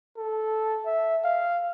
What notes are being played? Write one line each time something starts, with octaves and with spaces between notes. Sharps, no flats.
A4
E5
F5